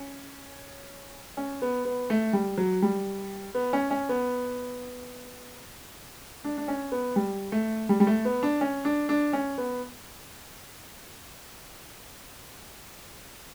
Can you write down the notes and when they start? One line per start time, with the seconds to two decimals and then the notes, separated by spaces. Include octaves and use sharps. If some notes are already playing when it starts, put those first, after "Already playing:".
Already playing: C#4
1.37 C#4
1.62 B3
1.85 B3
2.10 A3
2.33 G3
2.58 F#3
2.82 G3
3.55 B3
3.73 C#4
3.91 C#4
4.09 B3
6.44 D4
6.58 D4
6.68 C#4
6.92 B3
7.16 G3
7.52 A3
7.89 G3
8.00 G3
8.07 A3
8.25 B3
8.43 D4
8.61 C#4
8.85 D4
9.09 D4
9.33 C#4
9.58 B3